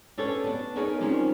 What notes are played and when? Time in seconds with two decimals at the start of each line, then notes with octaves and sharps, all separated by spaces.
0.18 C#4 D4 G4 A4 B4 C#5
0.44 B3 D4
0.76 B3 D#4 G#4 A#4 C#5
1.00 D#3 F3 G3 C4 C#4 G4